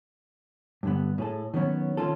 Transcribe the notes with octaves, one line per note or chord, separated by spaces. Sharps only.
G2 D3 B3
A2 G#4 A4
D#3 F#3 B3 C#4
D#3 C#4 F4 A4